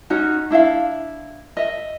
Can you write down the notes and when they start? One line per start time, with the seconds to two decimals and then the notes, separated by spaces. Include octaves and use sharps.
0.10 C#4 D#4 F#4
0.50 D4 E4 E5 F5
1.57 D#5 E5